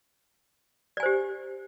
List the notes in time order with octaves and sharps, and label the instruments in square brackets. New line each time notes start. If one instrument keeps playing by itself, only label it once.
[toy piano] D5
G#5
C5
G4